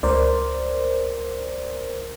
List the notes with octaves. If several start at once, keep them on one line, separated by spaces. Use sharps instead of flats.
C#2 A#4 C5 D5